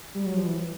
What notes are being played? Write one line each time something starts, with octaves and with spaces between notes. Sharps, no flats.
G3
F#3
F3
E3